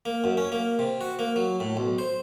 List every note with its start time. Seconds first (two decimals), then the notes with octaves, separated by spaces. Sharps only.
0.05 A#3
0.24 F#2
0.37 C#4
0.52 A#3
0.79 C3
1.01 F#4
1.19 A#3
1.36 F#3
1.60 A2
1.77 B1
1.98 C5